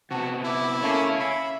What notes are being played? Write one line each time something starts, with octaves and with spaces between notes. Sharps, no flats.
C3 B3 F#4 A5
E4 D6
A3 A#3 C#4 C#5 F5
E5 B5